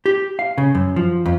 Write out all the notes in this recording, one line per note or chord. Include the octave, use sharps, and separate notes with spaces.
G4
F5
C#3
F#2
F3
F2